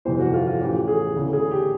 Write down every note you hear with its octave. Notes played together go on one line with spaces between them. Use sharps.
G1 F2 C3 E3 C5
F#4
F4
F4
A1 A2 E3 G4
G#4
D2 C#3 E3
G#4
G4